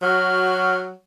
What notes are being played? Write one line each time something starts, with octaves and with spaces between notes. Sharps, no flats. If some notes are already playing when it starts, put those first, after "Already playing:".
F#3 F#4 F6